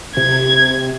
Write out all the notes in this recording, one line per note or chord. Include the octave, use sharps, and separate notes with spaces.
C3 G#6